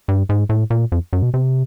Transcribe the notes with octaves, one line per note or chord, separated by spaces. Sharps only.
G2
G#2
A2
A#2
F2
F#2
B2
C3